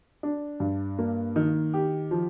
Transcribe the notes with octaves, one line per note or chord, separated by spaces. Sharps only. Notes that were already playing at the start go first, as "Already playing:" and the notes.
D4
G2
A#3
D#3
G4
F3